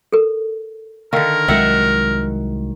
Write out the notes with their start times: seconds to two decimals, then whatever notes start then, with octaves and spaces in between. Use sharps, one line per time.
0.12 A4 A#4
1.13 D3 D#3 A#4 F5 E6
1.48 C2 D#3 F#3 G#3 E5 F#5